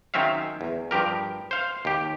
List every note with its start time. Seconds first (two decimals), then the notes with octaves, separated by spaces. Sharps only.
0.14 D#3 F#3 C4 C#4 E5 F5
0.61 E2
0.91 G2 F3 G4 A#4
1.51 C5 F5
1.85 D#2 G4